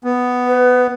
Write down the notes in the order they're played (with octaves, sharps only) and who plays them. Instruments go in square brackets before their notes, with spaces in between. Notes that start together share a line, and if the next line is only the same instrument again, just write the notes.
[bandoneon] B3
[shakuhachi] B4